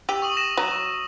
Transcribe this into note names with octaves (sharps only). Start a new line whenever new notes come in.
G4 E6 D#7 F7
C#6 D#6 F#7
A#6 E7
F#3